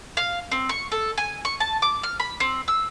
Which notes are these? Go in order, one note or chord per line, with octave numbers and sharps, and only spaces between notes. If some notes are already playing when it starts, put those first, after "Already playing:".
F5
C4
C#6
A4
G#5
C#6
A5
D6
F6
B5
C4
E6